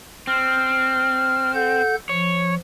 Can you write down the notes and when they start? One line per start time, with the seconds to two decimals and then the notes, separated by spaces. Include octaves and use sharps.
0.27 C4 F6
1.54 A4 F#5 G6
2.09 F3 C#5